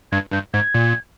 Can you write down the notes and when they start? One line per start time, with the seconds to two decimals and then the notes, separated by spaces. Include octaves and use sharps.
0.12 G2 G#6
0.32 G2 G6
0.54 G#2 G#6
0.75 A#2